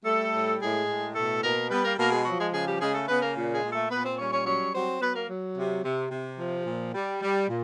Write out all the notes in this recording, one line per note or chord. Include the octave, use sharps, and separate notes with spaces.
G3 A3 A4
A2
A2 G#3 G#4
A2
B2 A3 A4
B2 A#3 A#4
G3 B3 B4
A#3 A#4
B2 A#3 A#4
G#3 G#4
F3 F#3 F#4
G#3 G#4
C#3 G#3 G#4
G3 G4
C#3 G#3 G#4
A3 A4
C#3 B3 B4
A#3 A#4
A#2
G#3 G#4
A#2
A3 A4
A#2 B3 B4
C4 C5
G3 C#4 C#5
C#4 C#5
F#3 C#4 C#5
F#3 C4 C5
F#3 B3 B4
A#3 A#4
F#3
C3
C3
C3
F3
A#2
G3
G3
A#2